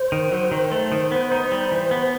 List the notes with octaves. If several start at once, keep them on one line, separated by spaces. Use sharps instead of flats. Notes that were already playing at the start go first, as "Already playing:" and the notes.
Already playing: C5
D#3
F#3
D#3
A3
D#3
B3
D#4
G3
E3
B3